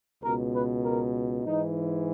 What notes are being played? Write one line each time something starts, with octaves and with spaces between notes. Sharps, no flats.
C#2 B2 A#4
B4
A#4
G#2 E3 D#4